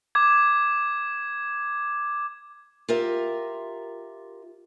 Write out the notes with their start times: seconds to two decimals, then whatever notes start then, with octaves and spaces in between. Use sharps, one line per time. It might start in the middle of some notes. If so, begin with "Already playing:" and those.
0.15 D6 G#6
2.88 F4 G4 A#4 E5